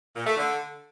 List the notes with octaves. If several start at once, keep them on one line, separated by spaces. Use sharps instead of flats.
A#2
A3
D3